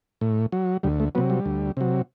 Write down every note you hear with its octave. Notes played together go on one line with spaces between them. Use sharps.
A2
F#3
D2 G3
A3
C3 F#3 B3
G3
D2
C3 F#3